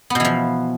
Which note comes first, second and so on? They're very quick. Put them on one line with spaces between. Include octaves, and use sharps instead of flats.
B3 B2 E3 F3